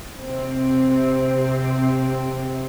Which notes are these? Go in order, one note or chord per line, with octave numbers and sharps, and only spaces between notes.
C3 C4